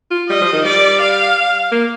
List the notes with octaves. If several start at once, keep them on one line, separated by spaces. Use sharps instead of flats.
F4
G3 D#5
F3
D#3
G3 D5
F5
A#3